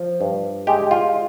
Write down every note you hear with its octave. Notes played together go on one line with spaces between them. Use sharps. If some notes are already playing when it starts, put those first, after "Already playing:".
Already playing: F3
G2
G#3 G4
F4